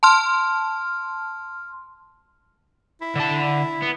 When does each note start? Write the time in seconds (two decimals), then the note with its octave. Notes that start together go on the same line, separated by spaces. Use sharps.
0.03 A5 C6 F6
3.01 E4
3.15 D3 A5
3.83 B3